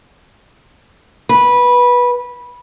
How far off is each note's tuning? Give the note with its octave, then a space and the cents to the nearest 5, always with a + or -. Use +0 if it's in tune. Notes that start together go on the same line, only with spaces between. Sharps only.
B4 -15